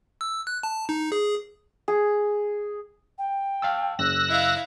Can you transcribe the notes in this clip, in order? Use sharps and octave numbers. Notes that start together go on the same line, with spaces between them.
E6
F#6
A5
D#4
G#4
G#4
G5
F5 A5 E6
F#2 C#3 E6 F#6 A#6
E4 D#5 F5